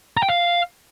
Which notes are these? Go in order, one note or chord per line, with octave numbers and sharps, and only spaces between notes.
A#5
G5
F5